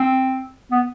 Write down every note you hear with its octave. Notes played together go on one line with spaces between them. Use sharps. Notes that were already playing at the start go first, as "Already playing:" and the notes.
Already playing: C4
B3